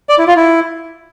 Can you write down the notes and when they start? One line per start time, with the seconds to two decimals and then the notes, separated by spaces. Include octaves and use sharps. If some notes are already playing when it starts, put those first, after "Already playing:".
0.09 D5
0.18 E4
0.27 F4
0.37 E4